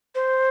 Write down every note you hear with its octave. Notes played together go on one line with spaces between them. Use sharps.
C5